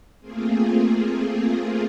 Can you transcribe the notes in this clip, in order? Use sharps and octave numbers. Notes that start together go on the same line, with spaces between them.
A3 A#3 C4 F4 G#4